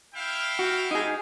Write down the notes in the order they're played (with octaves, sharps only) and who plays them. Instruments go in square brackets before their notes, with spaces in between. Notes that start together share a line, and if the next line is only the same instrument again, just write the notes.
[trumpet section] E4 F5 G5
[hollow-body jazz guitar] F#4
D#4 G#4